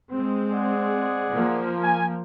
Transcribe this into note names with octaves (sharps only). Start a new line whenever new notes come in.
G#3 C4
G#4 D5 F#5
F3 A#3
G#5